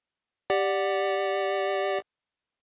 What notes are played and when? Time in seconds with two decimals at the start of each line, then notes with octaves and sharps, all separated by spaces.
0.50 G4 D5 F#5